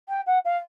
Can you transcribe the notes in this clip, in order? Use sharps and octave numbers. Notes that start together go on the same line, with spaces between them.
G5
F#5
F5